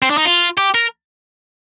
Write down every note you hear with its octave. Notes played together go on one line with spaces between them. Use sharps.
C4
D4
D#4
F4
G4
A#4